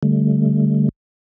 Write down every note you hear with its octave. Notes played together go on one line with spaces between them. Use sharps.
D3 G3 A3